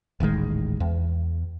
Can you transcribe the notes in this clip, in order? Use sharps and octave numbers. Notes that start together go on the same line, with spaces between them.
D#1 A1 D#3 G#3
E2